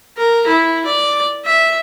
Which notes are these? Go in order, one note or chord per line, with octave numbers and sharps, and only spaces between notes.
A#4
E4
D5
E5